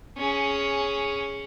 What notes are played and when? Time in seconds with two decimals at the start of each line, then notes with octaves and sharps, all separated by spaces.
0.18 C#4 G#4